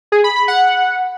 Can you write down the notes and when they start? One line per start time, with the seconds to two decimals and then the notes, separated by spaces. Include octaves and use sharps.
0.12 G#4
0.24 B5
0.36 B5
0.48 F#5